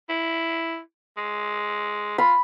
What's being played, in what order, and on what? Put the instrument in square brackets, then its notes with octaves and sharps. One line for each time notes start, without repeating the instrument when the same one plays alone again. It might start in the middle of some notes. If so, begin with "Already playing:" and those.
[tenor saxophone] E4
G#3
[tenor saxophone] F4 [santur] B5